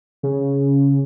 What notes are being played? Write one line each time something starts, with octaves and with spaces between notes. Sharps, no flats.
C#3